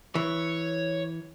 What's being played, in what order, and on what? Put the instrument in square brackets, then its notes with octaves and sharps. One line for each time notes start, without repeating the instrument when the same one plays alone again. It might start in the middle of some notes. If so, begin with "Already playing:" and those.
[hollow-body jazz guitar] E3 [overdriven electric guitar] C#5